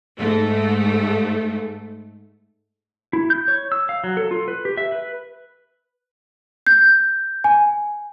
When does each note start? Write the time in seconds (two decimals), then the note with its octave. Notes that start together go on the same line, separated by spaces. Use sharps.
0.18 G#2 A3
3.13 E4
3.30 G6
3.48 C#5
3.72 E6
3.89 F5
4.04 F#3
4.17 A4
4.31 F4
4.48 B4
4.65 G4
4.77 E5
4.92 B4
6.67 G6
7.44 G#5